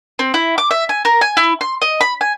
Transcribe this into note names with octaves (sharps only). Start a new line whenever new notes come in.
C4
E4
D6
E5
G#5
A#4
G#5
E4
C6
D#5
B5
G#5